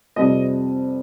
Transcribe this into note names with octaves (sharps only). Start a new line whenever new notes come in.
F2 C3 G3 C4 D#5